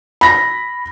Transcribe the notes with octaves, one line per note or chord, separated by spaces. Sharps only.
B5 A#6